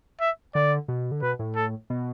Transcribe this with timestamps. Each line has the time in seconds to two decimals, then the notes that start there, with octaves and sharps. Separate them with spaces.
0.21 E5
0.55 D3 D5
0.88 B2
1.11 D3
1.22 B2 B4
1.39 A2
1.56 A4
1.90 B2